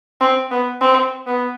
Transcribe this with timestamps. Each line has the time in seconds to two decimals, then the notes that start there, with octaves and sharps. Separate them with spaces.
0.21 C4
0.51 B3
0.81 C4
1.27 B3